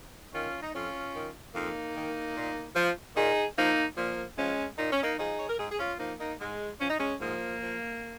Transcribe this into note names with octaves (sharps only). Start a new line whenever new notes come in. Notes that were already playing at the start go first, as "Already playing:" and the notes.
D#3 C#4 F4
D#4
F2 C#4 F4
D#3
F2 A#3 D#4
D#3
A#2
F3
A#2 D#4 G#4
F3 A#3 D#4
A#2 F3 A#3
F3 G#3 C#4
A#2 D#4
C#4
A#3 D#4
F3 D#4 G#4
C#5
A#4
G#2 D#4 G#4
G#4
C#4 F4
F3 A#3 D#4
A#3 D#4
G#2 G#3
F3 C#4
D#4
G#3 C#4
G#2 F3 A#3
F3